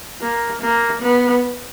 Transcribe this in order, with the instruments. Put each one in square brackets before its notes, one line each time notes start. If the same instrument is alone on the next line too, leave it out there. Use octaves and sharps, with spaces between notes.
[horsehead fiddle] A#3
A#3
B3